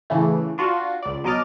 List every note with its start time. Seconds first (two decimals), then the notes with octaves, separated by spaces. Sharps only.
0.10 A2 C#3 E3 A3
0.58 D4 F4 F#4
1.03 C#2 D5
1.24 B2 F#3 D#5 D6 F6 A6